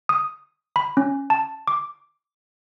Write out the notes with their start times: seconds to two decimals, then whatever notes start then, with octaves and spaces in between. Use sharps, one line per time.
0.09 D#6
0.76 B5
0.97 C#4
1.30 A5
1.67 D6